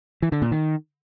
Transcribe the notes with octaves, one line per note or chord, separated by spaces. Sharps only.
E3
D3
A#2
D#3